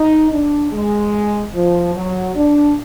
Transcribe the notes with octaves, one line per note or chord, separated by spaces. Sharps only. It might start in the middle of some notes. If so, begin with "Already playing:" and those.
Already playing: D#4
D4
G#3
F3
F#3
D4